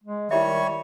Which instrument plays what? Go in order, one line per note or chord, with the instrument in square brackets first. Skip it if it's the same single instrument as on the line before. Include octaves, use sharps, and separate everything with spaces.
[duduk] G#3
[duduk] D#3 [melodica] G3 C#5 C#6 [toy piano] E4 G4 E5